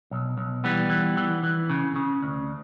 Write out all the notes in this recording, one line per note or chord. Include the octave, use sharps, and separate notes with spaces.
B1
B1
E3 G3 B3
E3
E3
E3
C#3
C#3
D2